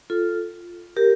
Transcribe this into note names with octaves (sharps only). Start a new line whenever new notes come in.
F4 A4
G4 A#4